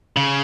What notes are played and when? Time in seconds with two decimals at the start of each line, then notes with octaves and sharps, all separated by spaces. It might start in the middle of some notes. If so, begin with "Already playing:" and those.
0.17 C#3